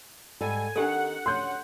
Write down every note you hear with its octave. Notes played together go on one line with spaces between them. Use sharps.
G#2 G3 A4 G#5
D#3 C4 D4 D#4 G4 A4 F#5
D2 C#4 C6 G6